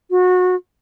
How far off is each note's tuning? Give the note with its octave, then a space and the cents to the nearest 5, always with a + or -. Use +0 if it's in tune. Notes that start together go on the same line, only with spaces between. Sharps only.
F#4 -25